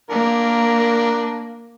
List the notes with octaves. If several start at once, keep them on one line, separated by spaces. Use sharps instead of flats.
A#3 D4 A#4